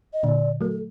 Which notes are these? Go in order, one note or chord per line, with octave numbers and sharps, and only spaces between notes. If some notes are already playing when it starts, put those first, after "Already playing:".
D#5
A#2 D3 D5
F#3 A3 A#4
A4